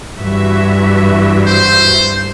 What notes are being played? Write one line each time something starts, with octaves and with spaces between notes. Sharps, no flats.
G2 E3 F#4 E5
C5